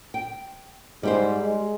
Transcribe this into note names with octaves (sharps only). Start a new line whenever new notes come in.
G5
G#2 G3 G4 C5
G#3